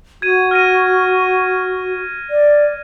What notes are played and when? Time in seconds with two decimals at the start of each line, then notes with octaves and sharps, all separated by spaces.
0.22 F#4 G#6 D#7
0.51 F6 A#6 D#7
2.30 D5